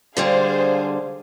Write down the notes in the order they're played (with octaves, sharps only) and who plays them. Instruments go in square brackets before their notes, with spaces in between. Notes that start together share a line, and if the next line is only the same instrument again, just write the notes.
[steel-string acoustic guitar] D3 G3 G#3 [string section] G#4 C5 F5